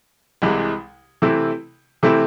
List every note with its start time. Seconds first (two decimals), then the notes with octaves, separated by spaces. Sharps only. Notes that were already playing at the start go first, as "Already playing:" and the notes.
0.42 C2 C3 E3 G#3
1.22 C3 E3 A3 C4 E4
2.03 C3 E3 A3 C4 E4